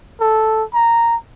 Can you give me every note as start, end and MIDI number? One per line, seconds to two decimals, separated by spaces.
0.21 0.63 69
0.74 1.16 82